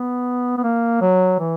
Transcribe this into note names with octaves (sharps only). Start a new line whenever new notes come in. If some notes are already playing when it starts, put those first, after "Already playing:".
Already playing: B3
B3
A#3
F#3
E3